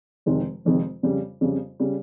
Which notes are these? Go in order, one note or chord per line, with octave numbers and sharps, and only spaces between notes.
F1 F2 D#3 G#3 C4
F1 F2 D#3 G#3 C4
F2 C#3 G3
F2 C#3 G3
C#3 G3